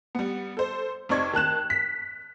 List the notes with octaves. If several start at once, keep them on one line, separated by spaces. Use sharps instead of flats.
G3 B3
A4 C5
F1 C4 D#4 D5 C#6 G#6
D#3 A5 F#6 E7
B6